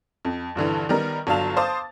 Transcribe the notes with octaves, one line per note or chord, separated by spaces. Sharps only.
F2
A#1 G2 D3 E3
D#3 G3 B3 A#4
G1 F#3 D4 F5 A5 F7
C5 F5 A5 D6 D#6 A6